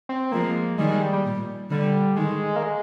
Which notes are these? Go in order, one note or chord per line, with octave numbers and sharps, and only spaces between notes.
C4
F3 G#3 A#3
D#3 G3 G#3
G#3
G3
G3
A#2
D3 G3
D#3 G#3
A#3
G#3